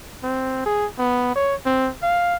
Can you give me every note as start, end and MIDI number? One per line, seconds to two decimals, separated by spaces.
0.23 0.62 60
0.66 0.86 68
0.98 1.32 59
1.36 1.55 73
1.65 1.90 60
2.03 2.35 77